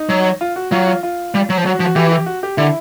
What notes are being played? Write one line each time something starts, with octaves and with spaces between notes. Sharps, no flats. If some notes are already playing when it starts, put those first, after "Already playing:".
Already playing: D#4
F#3
F4
F#4
F#3 F4
F4
F4
G3
F#3
F3
F#3 F#4
F3
F#4
E3 G4
G4
F#4
G4
D3 E4